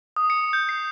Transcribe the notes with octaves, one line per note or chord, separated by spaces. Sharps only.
D#6
C#7
G6
C7